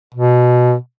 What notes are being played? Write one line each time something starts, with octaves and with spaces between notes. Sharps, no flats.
B2